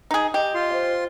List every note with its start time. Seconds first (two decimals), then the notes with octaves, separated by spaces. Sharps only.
0.11 D#4 G#4
0.34 G4 D#5
0.55 F4 C6
0.73 C5